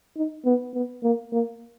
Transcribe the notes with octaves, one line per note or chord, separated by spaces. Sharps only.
D#4
B3
B3
A#3
A#3